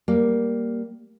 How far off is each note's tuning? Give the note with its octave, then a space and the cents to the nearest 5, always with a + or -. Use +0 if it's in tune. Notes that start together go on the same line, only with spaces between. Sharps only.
G3 -5 A#3 +0